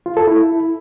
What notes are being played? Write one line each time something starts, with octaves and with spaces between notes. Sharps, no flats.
F4
A4
E4